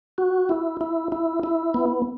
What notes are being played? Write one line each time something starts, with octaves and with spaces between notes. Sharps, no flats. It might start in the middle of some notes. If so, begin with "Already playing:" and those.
F#4
E4
E4
E4
E4
B3